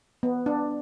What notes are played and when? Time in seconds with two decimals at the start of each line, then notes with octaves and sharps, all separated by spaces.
0.23 B3
0.46 D4